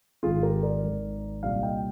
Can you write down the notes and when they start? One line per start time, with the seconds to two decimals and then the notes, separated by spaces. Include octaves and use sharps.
0.23 G#1 G#2 D#3 F4 G#4
0.43 G4 A#4
0.63 A#4 D5
0.83 G#1 G#2 D#3
1.43 C2 A#2 G3 D4 D5 F5
1.63 D#5 G5